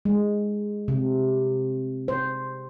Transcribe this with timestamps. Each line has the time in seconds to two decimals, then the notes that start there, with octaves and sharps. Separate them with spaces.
0.05 G#3
0.88 C3
2.08 C5